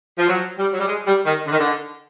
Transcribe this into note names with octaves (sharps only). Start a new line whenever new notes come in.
F3
F#3
G3
F#3
G3
G#3
G3
D#3
D3
D#3
D3